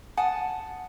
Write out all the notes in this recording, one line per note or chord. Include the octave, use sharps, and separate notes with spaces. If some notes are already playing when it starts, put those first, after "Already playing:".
F#5 G#5 A5 D#6